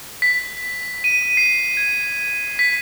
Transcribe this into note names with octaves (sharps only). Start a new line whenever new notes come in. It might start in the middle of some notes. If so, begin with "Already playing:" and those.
B6
D#7
C7
G#6
B6